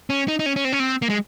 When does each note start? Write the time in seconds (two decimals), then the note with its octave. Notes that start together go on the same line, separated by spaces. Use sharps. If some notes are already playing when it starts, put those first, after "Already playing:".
0.10 C#4
0.28 D#4
0.39 D#4
0.46 C#4
0.56 C#4
0.65 C4
0.72 C#4
0.80 C4
1.02 A#3
1.09 G#3